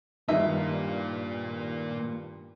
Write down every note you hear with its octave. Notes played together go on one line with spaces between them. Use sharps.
G2 D#3 G3 A#3 D#4 F4 E5